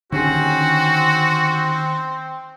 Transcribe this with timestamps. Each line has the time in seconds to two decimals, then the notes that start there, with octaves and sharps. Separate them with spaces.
0.12 D#2 D3 D#3 C4 C#4 F#4 G#4